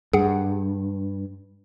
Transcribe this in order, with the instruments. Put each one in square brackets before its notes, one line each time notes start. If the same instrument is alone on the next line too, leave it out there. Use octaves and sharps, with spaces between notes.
[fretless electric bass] G2 [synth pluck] G#4 F#5